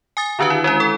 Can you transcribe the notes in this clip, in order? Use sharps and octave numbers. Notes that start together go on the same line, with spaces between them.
G#5 D#6 A6
D3 D#3 D4 F#4 B4
E4
G#3 C#4 E4
A4